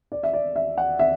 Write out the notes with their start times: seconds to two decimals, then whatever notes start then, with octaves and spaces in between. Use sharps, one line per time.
0.12 D5
0.23 E5
0.34 D5
0.56 E5
0.78 F#5
0.99 E5